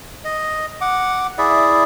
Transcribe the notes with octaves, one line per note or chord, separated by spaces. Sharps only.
D#5
F#5 D6
E4 G#4 D5 E5